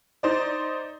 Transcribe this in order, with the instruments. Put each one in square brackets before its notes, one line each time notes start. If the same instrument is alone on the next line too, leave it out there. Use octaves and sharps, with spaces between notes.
[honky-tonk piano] D#4 C5 D5